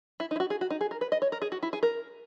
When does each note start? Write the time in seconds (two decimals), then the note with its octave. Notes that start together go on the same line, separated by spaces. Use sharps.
0.20 E4
0.31 D#4
0.36 E4
0.40 F#4
0.50 G#4
0.61 F#4
0.70 D#4
0.81 G#4
0.91 A#4
1.01 B4
1.12 D#5
1.22 C#5
1.32 A#4
1.42 G#4
1.52 F#4
1.63 E4
1.73 G#4
1.83 A#4